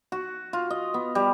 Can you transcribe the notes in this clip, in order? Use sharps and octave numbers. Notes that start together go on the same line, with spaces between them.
F#4
F4
D#5
B3
G3